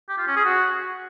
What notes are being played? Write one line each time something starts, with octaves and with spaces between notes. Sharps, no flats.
G4
F4
C#4
G#4
F#4